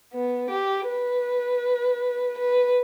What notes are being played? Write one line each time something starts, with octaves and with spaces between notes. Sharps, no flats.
B3
G4
B4
B4